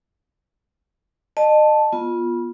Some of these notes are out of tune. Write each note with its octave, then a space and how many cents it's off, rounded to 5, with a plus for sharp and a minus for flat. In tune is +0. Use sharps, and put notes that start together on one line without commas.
D#5 -35 A5 +0
B3 -25 F4 +0